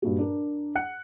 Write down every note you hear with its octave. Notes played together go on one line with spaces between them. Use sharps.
G2 A#2 F#4
D4 A#4
F#5 F#6 C#7